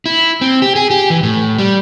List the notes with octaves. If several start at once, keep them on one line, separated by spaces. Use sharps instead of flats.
E4
C4
G4
G#4
G4
E3
A2
G3